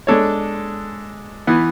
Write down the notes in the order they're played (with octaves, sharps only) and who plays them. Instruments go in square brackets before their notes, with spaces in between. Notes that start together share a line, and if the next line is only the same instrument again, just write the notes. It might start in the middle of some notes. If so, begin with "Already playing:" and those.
[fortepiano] G#3 D4 A4 C#5
E3 B3